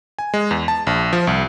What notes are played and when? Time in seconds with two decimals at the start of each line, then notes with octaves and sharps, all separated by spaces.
0.19 G#5
0.34 G#3
0.51 E2
0.68 A5
0.87 A#1
1.13 F3
1.27 C2